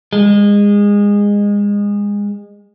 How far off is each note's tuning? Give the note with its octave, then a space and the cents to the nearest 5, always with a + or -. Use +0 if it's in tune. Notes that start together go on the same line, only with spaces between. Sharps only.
G#3 -25